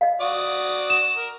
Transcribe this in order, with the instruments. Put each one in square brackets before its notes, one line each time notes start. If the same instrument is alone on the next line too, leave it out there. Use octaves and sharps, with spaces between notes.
[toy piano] D#5 F5
[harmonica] F#4 D5 D#6
[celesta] E7
[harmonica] A#4